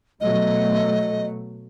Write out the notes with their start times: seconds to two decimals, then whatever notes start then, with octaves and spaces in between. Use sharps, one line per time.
0.21 B2 F#3 A3 D#5